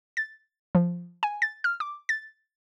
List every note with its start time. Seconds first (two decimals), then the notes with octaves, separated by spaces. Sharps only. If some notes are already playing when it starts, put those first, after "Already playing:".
0.17 A6
0.75 F3
1.23 G#5
1.42 A6
1.64 F6
1.80 D6
2.09 A6